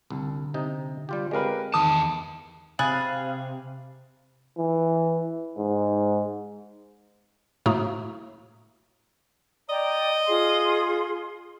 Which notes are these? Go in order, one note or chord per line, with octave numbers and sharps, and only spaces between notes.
C2 D3
C3 D#4
G3 F4 G4
G#3 C4 G4 A#4 B4 F5 A#6
E2 D#3 A5 D#6
C3 G#4 F5 B5 F#6 A6
E3
G#2
A2 A3 A#3 F#4 A#5 D#6
D5 D#5 G5 A#5
F4 G#4 C6